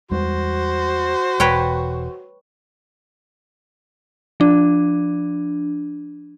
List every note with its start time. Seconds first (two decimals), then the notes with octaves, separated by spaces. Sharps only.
0.11 E2 G3 G#3 F#4 C5
1.40 E1 B4 C#5 G5
4.40 F3 D4